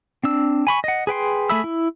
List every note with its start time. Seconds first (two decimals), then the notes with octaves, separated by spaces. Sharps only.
0.24 C4 D4 E6
0.67 G#5 B5 C#6
0.84 D#5 F#5
1.07 G#4 B4 G5 C6
1.50 A3 G#4 E5 B5 E6
1.64 E4